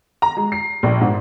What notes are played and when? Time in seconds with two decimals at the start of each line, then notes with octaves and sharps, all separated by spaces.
0.22 A#5
0.37 G#3
0.52 C7
0.83 A#1
1.01 G#2